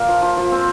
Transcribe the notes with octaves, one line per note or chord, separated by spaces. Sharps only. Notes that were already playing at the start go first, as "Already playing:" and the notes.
Already playing: A#2 A#3
F3
F3
F3
C4